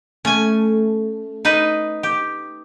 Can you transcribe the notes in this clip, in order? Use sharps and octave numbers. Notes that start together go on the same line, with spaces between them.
A3 C#4 G#5
D#4 B4 D#5
G4